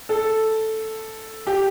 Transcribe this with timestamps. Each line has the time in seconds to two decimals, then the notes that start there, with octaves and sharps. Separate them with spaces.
0.09 A4
1.47 G4